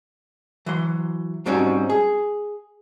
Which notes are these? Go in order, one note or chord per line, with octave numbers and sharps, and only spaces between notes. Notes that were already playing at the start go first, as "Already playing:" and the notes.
E3 F#3 C6
G#2 G3 C4 C#4 D#4 F#4
G#4